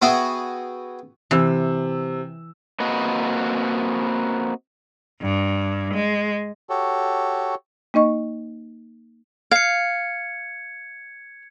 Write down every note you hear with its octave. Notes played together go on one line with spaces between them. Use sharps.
B3 F#4 G#4 E5 G5 G#5
C3 E3 E6
A#3 C4 F#4 B4 D#5
G2
G#3
F#4 G4 A4 C#5
A#3 D#4 D#5 C#6
F5 G#6 C#7